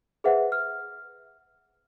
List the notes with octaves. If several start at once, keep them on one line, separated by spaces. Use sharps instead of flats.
G#4 B4 C5 E5 F#5
F6